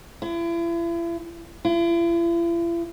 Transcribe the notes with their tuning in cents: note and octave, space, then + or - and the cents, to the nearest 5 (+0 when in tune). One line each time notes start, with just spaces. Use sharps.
E4 +40
E4 +45